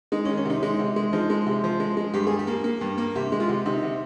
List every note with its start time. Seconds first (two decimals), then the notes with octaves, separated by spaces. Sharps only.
0.12 G#3 D#4
0.25 C#4
0.29 D#3
0.37 C#4
0.45 C3 D#4
0.63 G#3 D#4
0.79 C3
0.96 G#3
1.13 F3 D#4
1.30 G#3
1.46 C3
1.64 F3
1.80 G#3
1.97 G#3
2.14 G2 G4
2.27 G#4
2.31 G3
2.39 G4
2.47 A#3
2.64 A#3
2.81 G2
2.98 A#3
3.15 C3 G4
3.32 G#3
3.40 F4
3.49 C3
3.65 C3 D#4
3.83 C3